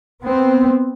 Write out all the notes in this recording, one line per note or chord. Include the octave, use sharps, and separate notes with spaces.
B3 C4